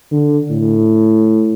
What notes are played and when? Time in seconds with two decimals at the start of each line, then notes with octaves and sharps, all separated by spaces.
0.12 D3
0.50 A2